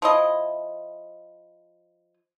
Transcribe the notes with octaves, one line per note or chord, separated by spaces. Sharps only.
F3 E4 D#5